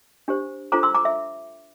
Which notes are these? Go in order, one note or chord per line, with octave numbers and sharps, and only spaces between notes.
D4 G4 C5
D4 F4 A4 C5 A#5 D6
C6 E6
A#5 D6
E5